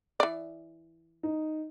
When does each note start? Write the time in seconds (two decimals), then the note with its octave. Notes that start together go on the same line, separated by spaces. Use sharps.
0.20 E3 D5
1.23 D#4